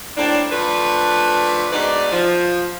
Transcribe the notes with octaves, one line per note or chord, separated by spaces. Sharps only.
A2 A#3 C4 D4
F3 A3 D4 B4
G#2 B2 D4 D#4 B4 D5
F3